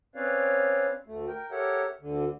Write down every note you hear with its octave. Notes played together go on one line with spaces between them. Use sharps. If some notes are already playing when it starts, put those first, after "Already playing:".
C4 C#4 B4 C#5 D5 F5
D2 A3
A#4 G5
G4 A4 A#4 C#5 E5 F#5
D2 D3